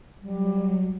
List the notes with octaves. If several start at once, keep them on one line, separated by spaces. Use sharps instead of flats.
F#3 G3